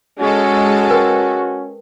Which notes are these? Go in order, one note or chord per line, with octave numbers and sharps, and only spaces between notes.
G#3 C#4 F#4 A4
A#4 B4 G5